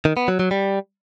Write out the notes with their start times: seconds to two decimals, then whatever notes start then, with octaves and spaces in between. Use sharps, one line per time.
0.05 D#3
0.17 B3
0.28 F#3
0.40 F#3
0.51 G3